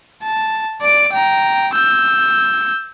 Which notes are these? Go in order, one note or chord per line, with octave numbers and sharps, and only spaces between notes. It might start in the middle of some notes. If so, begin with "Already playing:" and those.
A5
D5 D7
G5 A#5
E6 G6